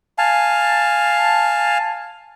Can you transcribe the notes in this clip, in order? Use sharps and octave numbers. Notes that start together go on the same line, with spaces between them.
F5 G#5 A5